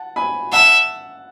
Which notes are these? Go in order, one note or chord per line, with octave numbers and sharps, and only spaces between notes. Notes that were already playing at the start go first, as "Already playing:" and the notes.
Already playing: F#5 A5
G#5 B5
E5 F#5 A5